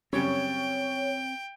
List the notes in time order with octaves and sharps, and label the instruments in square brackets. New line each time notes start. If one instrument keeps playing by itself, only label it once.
[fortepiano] F#2 C#3 G3 [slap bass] C4 [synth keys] C#5 [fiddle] G5